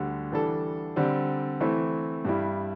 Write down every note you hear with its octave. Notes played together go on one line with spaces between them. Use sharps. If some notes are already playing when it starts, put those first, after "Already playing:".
Already playing: D2 D3 G3
E3 G3 D4 A4
D3 G3 C4
E3 A3 C4 E4
G2 G3 E4